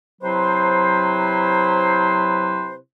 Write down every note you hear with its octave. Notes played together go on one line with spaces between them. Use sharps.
C3 F#3 E4 B4 C5